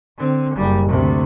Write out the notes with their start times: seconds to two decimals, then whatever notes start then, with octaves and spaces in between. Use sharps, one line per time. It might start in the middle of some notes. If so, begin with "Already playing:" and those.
0.18 D3 C4
0.55 F#1 G3
0.88 D2 C3